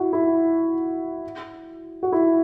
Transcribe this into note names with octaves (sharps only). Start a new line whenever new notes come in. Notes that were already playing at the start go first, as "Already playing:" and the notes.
Already playing: E4 F#4
E4
F#4
E4